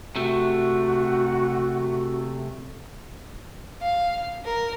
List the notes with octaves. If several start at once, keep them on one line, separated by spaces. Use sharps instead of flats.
C3 A3 F#4
F5
A#4